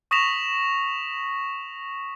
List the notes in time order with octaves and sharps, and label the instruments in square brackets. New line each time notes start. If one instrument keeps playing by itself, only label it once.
[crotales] C#6 D#6 A#6 B6 E7 F7